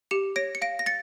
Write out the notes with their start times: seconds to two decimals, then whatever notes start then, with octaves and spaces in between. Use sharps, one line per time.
0.11 G4 C#7 E7
0.36 C#5 A#6 D7
0.55 C#7
0.62 F5 A#6 D7
0.79 A#6
0.86 A6 C#7